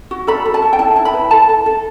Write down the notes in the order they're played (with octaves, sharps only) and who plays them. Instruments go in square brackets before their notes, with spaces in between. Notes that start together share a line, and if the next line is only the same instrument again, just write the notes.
[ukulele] F#4
A4 B5
A4
A5
A4
G5
E4 A5
E4 A5
B5
B4
A4 A5
A4
A4